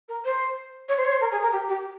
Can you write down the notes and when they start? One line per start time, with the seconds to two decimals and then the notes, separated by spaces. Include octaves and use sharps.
0.08 A#4
0.25 C5
0.89 C#5
0.97 C5
1.04 C#5
1.12 C5
1.21 A#4
1.32 G#4
1.42 A#4
1.52 G4
1.68 G4